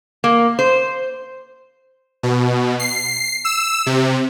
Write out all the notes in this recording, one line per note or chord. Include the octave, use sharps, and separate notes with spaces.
A#3
C5
B2
C7
E6
C3